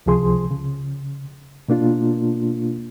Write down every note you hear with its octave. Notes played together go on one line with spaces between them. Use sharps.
C#2 C3 F3 G#4 C6
C#3
B2 A#3 D4 F4